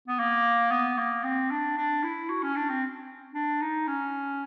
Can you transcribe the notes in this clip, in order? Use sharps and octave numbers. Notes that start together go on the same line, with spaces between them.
B3
A#3
B3
A#3
C4
D4
D4
E4
F#4
C#4
D4
C4
D4
D#4
C#4